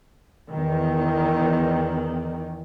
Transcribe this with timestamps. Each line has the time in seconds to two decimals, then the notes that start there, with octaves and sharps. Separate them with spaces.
0.50 E2 D#3